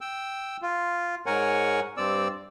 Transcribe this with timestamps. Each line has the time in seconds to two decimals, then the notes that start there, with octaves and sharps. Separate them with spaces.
0.01 G5 E6
0.62 F4
1.26 G#2 A#4 C#5 F#5 G#5
1.97 G2 C4 D5 E6